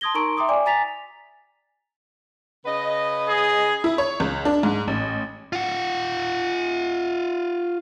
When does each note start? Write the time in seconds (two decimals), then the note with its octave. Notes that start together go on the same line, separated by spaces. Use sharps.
0.01 A5 C6 D#6 G#6 A#6 G7
0.14 D#4 A#4 A#5 C6 C#6 D7
0.37 E5 G5 A#5 C6 D6 D#6
0.49 D5 G5 G#5 D6
0.66 G#5 A#5 A6 B6 F7
2.66 C#3 B4 D#5
3.29 G#4
3.84 E4
3.98 C#5
4.20 C#2
4.45 D4
4.63 G#2
4.88 A1
5.53 F4 F#5